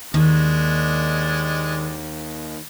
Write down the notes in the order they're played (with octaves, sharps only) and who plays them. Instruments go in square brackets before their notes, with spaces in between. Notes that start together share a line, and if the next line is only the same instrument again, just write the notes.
[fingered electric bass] D#2 [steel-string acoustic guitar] D#3 [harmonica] G#3 D4